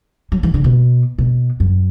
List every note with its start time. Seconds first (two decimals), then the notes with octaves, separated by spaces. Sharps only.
0.32 F#3
0.43 E3
0.54 D3
0.64 B2
1.18 B2
1.60 F#2